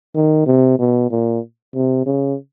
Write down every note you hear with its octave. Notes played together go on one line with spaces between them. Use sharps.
D#3
C3
B2
A#2
C3
C#3